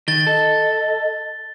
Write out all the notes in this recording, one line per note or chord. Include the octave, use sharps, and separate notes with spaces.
D#3 A6 G7
A4 D#5